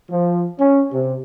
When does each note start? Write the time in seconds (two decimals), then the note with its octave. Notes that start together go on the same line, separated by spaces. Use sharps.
0.11 F3
0.59 C#4
0.92 C3